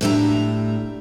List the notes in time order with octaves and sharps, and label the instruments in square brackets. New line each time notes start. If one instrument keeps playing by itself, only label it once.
[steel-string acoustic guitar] A2 G3 D4 D5 E5 A#5